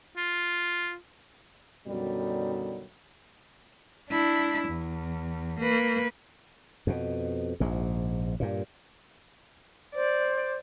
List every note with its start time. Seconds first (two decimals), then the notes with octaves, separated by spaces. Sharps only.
0.17 F4
1.88 F#2 B2 D3 D#3 F#3 G3
4.11 D4 E4
4.69 E2
5.60 A#3 B4
6.87 F2 B2
7.60 A#1 G#2
8.40 G2 A#2
9.95 C5 D5